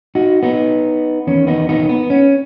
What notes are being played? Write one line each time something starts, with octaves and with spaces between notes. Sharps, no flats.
D#4 F#4
B3 D#4
E2 D#3 C#4
B3 D#4
B3 D#4
B3
C#4